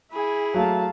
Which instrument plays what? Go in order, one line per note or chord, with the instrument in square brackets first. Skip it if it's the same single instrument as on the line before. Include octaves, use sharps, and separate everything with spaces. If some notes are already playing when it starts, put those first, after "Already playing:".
[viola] E4 G#4 [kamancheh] G#5 B5
[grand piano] F#3 A3 [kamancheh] F5 A5